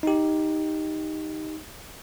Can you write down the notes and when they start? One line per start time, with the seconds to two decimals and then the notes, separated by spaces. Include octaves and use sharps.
0.03 D#4 G4